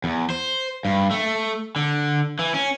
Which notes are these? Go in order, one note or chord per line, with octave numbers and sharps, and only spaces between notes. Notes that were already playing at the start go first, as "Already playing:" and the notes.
E2
C5
G2
A3
D3
E3
C#4